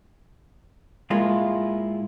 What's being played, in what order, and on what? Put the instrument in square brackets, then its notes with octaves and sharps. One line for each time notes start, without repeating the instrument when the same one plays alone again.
[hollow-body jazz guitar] A2 G#3 A#3 E4 F4